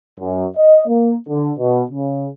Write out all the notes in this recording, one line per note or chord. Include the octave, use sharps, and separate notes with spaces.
F#2
D#5
A#3
D3
B2
C#3